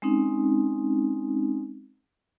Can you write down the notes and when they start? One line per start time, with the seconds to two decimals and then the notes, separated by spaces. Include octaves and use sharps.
0.02 G#3 C4 C#4 D#4